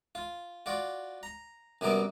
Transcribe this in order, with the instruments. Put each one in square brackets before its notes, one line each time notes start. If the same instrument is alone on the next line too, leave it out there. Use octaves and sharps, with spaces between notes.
[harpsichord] F4
F4 F#4 D5
A#5
F#2 C3 G3 B3 A#4 D6